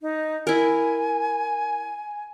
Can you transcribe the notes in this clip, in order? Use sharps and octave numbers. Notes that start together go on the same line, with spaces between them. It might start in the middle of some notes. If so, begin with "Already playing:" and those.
D#4
E4 A#4 G#5